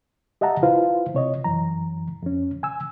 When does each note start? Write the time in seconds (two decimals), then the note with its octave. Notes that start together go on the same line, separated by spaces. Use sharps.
0.41 G4 D#5 E5 F#5 A5 A#5
0.63 E4 F4 B4 C5 F5
1.14 C3 C#5 D#5
1.44 F#2 E3 A#5
2.23 F2 C#4
2.63 G#5 E6